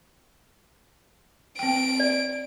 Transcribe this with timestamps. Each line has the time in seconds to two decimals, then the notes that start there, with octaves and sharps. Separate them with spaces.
1.59 C4 G5 D7
2.00 D5